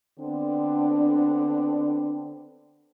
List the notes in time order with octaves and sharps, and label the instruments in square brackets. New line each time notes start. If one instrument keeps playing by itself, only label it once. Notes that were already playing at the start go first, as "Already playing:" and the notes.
[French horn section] D3 B3 C4 D4